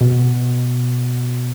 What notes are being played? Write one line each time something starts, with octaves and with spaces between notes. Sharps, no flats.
B2